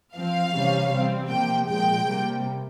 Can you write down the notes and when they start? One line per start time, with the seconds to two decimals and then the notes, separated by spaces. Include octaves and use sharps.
0.16 F3 C4 F5
0.54 C3 E3 G3 C#4
0.93 E3 G3 C4
1.30 C3 F3 A#3 G5
1.68 A#2 F3 G#3 G5
2.06 C3 G3 A#3